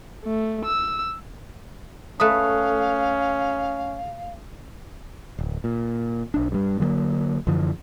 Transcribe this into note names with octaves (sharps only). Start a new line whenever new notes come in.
A3
E6
A3 C#4 B4 F5 D#6 F#6
D1
A#2
B1 D4
G2 G3
D3 F#3 G#3 A#3
F#2 D3 E3 F3